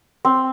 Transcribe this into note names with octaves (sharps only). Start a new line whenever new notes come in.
C4